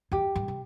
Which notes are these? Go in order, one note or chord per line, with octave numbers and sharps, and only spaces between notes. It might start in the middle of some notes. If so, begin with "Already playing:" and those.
E2 G4
G2
C3